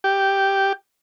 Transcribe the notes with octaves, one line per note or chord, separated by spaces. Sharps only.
G4